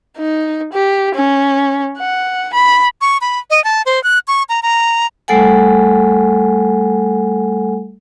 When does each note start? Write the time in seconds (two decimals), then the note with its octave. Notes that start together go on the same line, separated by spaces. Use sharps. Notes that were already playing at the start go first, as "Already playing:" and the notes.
0.18 D#4
0.73 G4
1.15 C#4
1.98 F#5
2.54 B5
3.01 C#6
3.21 B5
3.50 D#5
3.64 A5
3.86 C5
4.04 F#6
4.28 C#6
4.49 A#5
4.63 A#5
5.28 G3 A3 A4 F#5 G#5